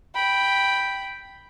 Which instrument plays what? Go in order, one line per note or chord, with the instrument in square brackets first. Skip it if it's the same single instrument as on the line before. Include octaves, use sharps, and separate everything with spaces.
[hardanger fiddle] G5 B5